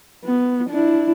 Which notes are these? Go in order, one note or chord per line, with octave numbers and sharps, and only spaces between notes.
B3
D4 E4